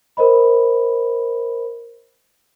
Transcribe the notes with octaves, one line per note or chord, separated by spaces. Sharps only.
A#4 C5 D#5 B5